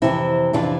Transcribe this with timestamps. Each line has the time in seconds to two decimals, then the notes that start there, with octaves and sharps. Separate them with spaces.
0.02 F2 C3 E3 C4 E4
0.53 F2 C3 E3 D4 F4